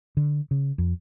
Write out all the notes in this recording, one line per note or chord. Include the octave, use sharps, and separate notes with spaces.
D3
C#3
F2